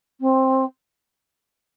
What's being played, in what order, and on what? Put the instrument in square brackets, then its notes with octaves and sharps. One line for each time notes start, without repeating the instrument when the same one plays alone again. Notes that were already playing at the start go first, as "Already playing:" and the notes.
[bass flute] C4